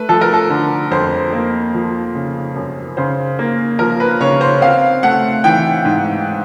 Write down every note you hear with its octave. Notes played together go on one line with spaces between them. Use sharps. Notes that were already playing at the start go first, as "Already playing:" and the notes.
Already playing: A3 B4
F3 A4
A#4
A4
D3
F2 C5
A#3
F3
C#3
F#2
C#3 C5
A#3
F3 A#4
B4
C#3 C#5
C5
C4 F5
A3 F#5
E3 G5
G#2